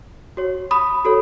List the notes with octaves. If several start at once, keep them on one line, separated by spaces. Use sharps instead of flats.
F#4 C#5
B5 D#6
F#4 A4 C#5